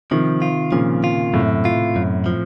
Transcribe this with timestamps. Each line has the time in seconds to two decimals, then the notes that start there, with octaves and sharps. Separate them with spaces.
0.11 C3 D#3 F3
0.42 F4
0.72 A#2 C#3 F3
1.04 F4
1.34 F#2 A2 C3
1.65 F4
1.96 F#2
2.26 F3